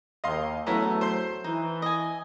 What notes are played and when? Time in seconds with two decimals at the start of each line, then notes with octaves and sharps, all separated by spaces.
0.24 D#2 D#5 F5 C6
0.66 E2 F#3 A3 B3 C#4 E4 A#5
1.01 C5 C6
1.44 E3 D#4
1.82 D#5 G#5